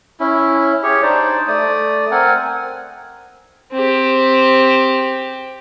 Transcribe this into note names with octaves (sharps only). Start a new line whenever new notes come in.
C#4 E4
G4 G#4 C#5
D4 D#4 C5 D5
A3 D5 D#6
C4 A#4 F#5 G#5
C4 G4